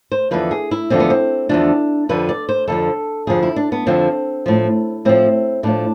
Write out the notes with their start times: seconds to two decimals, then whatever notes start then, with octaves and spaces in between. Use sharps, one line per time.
0.12 C5
0.31 E2 D3 F3 B4
0.51 G#4
0.71 E4
0.90 E2 D3 F3 C4
1.00 B3
1.10 C4
1.49 E2 D3 F3 D4
2.09 F2 D3 F3 B4
2.29 D5
2.49 C5
2.68 F2 D3 F3 A4
3.27 F2 D3 F3 G#4
3.43 E4
3.56 D4
3.72 B3
3.87 F2 D3 F3 C4
4.46 A2 F3
5.05 A2 F3 C4
5.63 A2 F3 D4